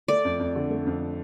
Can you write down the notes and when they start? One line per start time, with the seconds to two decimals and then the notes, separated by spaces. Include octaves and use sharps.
0.08 A3 D5
0.25 F2
0.39 F2
0.55 D3
0.70 A3
0.87 F2